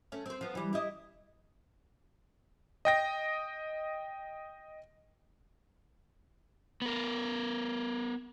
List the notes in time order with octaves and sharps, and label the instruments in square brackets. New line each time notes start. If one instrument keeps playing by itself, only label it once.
[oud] A3 C#4
C4 C5
F3 B3
E3 G3
E4 G4 D#5
[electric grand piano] D#5 G5 A#6
[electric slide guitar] B3 A#4